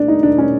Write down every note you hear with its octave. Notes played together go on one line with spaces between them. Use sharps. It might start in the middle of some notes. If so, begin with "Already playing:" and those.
Already playing: D4
D#4
D4
C#4